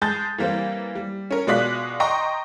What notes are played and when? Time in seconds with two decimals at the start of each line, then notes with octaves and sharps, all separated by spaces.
0.02 G#3 G#4 A5 G6 A6
0.38 E3 G3 A#3 C4
0.95 G3
1.31 C#4 A#4
1.47 B2 G#3 F4 D5 F#6 B6
2.00 D#5 G5 A#5 C6 C#6